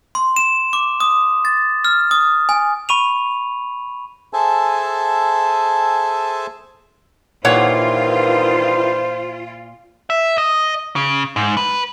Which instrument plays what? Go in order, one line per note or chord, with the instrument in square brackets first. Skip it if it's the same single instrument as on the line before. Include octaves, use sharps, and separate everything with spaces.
[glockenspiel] C6
E7
D6
D#6
A6
F6
D#6
G#5
B5 C#6 D#7 F7
[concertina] G#4 A4 C5 E5 G#5 A5
[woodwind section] G2 D#3 E3 [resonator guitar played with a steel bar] A#2 C#5 F#5 [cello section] F4 [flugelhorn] C5
[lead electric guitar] E5
D#5
C#3
G#2
B4